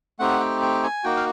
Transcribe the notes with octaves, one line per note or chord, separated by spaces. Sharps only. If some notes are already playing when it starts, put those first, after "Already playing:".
A3 C4 D#4 G4 F#5
G5
G5
G#5
A#3 D#4 F#4 G5
F5